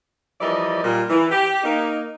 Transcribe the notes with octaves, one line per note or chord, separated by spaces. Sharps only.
E3 F3 G3 A#4 D5 D#5
A#2 G3
E3
G4
A#3 D#4